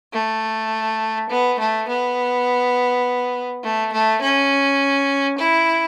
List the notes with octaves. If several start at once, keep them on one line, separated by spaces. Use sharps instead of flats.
A3
B3
A3
B3
A3
A3
C#4
E4